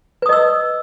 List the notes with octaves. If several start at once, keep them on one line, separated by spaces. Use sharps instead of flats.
B4 D#5 D#6 E6